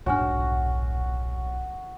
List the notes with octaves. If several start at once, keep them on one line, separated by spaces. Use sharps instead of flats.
D#1 B1 G#2 D4 F#4 C#5 G#5 F6